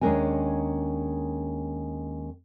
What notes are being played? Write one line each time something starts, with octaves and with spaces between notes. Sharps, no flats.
D#2 G#3 C#4 D4 A#4 G#5